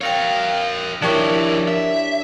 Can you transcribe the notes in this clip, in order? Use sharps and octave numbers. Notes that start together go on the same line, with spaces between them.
A#4 C#5 F5 G5
F3 D4 E4 G4 A#4 C#5
E5